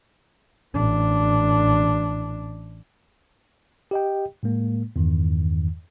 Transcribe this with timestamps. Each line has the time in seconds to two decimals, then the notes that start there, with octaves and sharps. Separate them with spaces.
0.74 A1 D4
3.91 G4 D#5 G5
4.43 A2 G#3 A#3
4.96 E2 G2 D#3